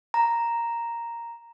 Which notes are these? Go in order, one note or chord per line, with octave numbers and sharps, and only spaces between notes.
A#5